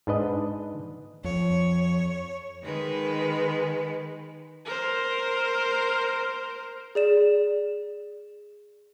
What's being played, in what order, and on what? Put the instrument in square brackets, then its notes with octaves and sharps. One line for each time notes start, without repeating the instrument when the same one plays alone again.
[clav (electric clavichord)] G#2 D4 B4 D#5
[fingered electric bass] F2 [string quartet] C#5
[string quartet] D#3 G#3 B4
[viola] A#4 C5
[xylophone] G#4 D5 E7